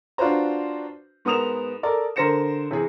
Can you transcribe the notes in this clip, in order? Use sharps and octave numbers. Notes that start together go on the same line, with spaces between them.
D4 F4 F#4 B4 C5 A#5
G#2 B3 A#4 D#6 E7 F7
A4 A#4 D5
D3 A#4 C5 A#6 C#7 E7
C3 E3 G#4